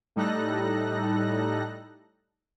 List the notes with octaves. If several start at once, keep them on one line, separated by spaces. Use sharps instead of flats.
A2 G3 D#4 A4 F#6 A#6